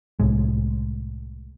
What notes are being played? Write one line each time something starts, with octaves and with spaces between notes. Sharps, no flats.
C2 A2 G#3